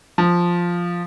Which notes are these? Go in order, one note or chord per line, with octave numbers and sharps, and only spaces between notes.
F3